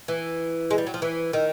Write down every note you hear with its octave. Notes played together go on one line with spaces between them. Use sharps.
E3
G#3
G3
F#3
F3
E3
D#3